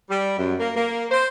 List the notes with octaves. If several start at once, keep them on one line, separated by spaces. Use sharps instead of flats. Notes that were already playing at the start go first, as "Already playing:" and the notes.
G3
F#2
A#3
A#3
C5